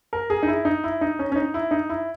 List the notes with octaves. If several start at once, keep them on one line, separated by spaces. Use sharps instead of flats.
A#4
G#4
D#4
E4
D#4
E4
D#4
C#4
C#4
D#4
E4
D#4
E4